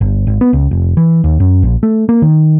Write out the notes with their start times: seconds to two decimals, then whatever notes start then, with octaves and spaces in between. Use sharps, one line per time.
0.01 G1
0.27 G#1
0.41 B3
0.53 C#2
0.71 F1
0.97 E3
1.24 D#2
1.40 F#2
1.63 A#1
1.83 A3
2.09 A#3
2.22 D#3